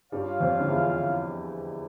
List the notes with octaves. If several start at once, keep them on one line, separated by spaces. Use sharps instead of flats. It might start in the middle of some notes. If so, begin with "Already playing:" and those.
G2 G3 F4 C#5 F5
F2 F3
D3
E2 E3
D3